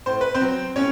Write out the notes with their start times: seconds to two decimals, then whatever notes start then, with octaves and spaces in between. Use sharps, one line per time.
0.06 A2 C5
0.21 B4
0.34 C4 C5
0.41 F#3
0.76 A2 C#4 C#5